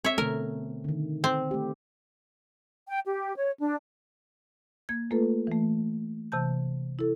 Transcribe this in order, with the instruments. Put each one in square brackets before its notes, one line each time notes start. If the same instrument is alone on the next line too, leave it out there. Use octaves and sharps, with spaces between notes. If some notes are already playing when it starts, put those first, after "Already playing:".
[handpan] C4 [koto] C#5 E5
[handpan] B2 D3 A3 [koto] A#4
[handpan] D3 D#3
[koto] C4
[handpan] A3 G4
[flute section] G5
G4
C#5
D4
[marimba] A#3 G#6
A3 A#3 F4 A4 B4
E3 A3
C3 E3 A5 G6
E4 A4